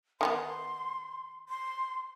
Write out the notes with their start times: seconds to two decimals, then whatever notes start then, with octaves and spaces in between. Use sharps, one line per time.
0.21 D#3 G#3 B3 C6
1.49 C6